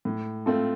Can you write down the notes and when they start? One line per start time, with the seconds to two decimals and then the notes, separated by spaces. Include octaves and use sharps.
0.05 A2
0.46 A3 C4 F4 A4